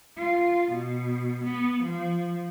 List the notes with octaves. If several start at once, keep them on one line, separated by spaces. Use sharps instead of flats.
F4
B2
B3
F3